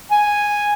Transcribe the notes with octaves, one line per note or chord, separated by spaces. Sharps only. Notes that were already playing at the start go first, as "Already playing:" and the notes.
G#5